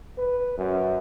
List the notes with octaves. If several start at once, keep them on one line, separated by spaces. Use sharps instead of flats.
B4
F#2